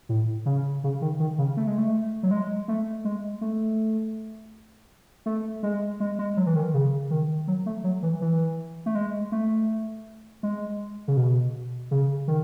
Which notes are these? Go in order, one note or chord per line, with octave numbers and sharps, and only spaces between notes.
A2
C#3
C#3
D#3
D#3
C#3
A3
G#3
A3
F#3
G#3
A3
G#3
A3
A3
G#3
G#3
G#3
F#3
E3
D#3
C#3
D#3
F#3
A3
F#3
E3
E3
A3
G#3
A3
G#3
C#3
B2
C#3
D#3